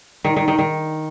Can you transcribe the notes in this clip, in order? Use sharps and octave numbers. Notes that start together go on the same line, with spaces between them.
D#3
D#3
D#3
D#3